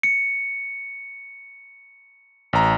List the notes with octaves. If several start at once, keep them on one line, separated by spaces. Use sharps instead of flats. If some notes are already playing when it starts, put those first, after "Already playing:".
C#7
A1 A#5